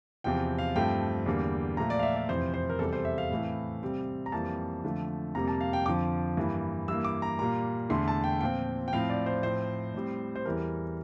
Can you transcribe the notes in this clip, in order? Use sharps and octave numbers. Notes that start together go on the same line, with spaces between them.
E2 C3 F3 G5
F5
G2 F3 A3 C4 G5
E2 D3 G3 A#3
A#2 F3 A3 A#5
D5
F5
E5
D5
F2 C3 E3 C5
C5
A#4
E2 C3 G3 A4
C5
E5
F5
A2 E3 A3 C4
C3 G3 C4
A#5
F2 E3 G3 A#3 A5
F2 D3 F3 A3
F2 C3 G3 A#3 A#5
A5
F5
G5
F2 D3 F3 D6
G2 E3 A#3
G2 E3 A#3 E6
D6
A#5
A#2 G3 A#3 A#5
E2 D3 A3 C6
A5
G5
A#2 F3 C4 G5
G5
A2 F3 C4 F5
D5
C5
A2 F3 C4 C5
A2 G3 C4
C5
E2 E3 G3 A#4